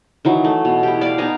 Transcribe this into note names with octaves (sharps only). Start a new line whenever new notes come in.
D#3 E3 F#3
A3
B2
E4 G4
D5 F5 B5
B3 D#4 G#5 A#5